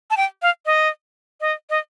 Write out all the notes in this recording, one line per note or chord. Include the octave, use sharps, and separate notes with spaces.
A5
G5
F5
D#5
D#5
D#5